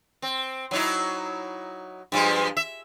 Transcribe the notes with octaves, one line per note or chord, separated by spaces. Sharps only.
C4
F#3 D#4 E4
G2 F3 G#3
E5